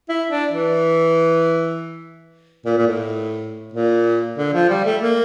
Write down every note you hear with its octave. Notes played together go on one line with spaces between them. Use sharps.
E4
D4
E3
A#2
A#2
A2
A#2
D3
F3
G3
A3
A#3